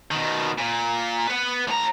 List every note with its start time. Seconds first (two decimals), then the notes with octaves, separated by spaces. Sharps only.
0.11 B2 D#3
0.58 A#2
1.27 B4 F#5
1.68 A2 A#5